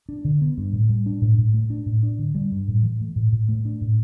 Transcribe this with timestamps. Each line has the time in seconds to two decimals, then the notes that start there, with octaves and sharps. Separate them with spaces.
0.09 D4
0.25 D3
0.41 B3
0.58 G2
0.73 A2
0.89 G3
1.06 D4
1.22 A2
1.38 A2
1.54 A3
1.70 D4
1.86 A2
2.03 D4
2.19 D3
2.35 G3
2.52 G2
2.68 A2
2.83 E3
3.01 A3
3.16 A2
3.32 A2
3.48 A3
3.65 D4
3.81 A2